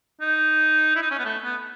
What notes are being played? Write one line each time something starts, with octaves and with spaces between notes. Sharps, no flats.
D#4
E4
D#4
C#4
B3
A3
B3